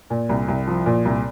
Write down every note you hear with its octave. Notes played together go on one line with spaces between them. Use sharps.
A#2
C2
C2
F3
A#2
C2